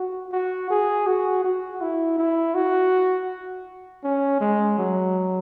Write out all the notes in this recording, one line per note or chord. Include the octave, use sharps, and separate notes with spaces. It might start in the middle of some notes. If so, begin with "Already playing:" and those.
Already playing: F#4
F#4
G#4
F#4
F#4
E4
E4
F#4
C#4
G#3
F#3